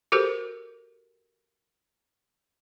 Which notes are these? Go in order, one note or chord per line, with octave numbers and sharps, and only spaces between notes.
F#4 G4 A4 A#4 C5